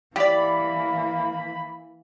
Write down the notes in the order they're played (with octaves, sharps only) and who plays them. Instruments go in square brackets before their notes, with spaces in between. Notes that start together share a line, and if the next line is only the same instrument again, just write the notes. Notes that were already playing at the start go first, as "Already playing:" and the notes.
[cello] E3 A#3 [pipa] G4 D5 [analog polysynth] B5